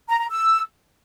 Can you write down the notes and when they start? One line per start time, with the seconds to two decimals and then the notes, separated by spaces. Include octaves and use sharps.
0.09 A#5
0.20 A#5
0.31 E6